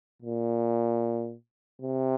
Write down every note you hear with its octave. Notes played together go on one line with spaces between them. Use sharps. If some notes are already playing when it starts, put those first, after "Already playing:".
A#2
C3